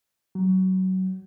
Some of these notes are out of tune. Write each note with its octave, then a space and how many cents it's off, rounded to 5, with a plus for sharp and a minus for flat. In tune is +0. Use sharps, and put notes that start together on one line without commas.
F#3 +20